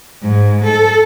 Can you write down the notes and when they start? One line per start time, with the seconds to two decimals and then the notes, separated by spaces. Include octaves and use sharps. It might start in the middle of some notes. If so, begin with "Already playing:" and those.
0.22 G#2
0.64 A4